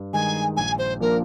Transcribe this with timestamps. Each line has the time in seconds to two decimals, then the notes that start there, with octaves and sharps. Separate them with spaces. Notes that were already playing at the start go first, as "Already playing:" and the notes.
Already playing: G2
0.13 D#3 G#3 D#4 G#5
0.56 A#1 G#5
0.78 C5
1.00 A#2 F3 A#3 D4 A#4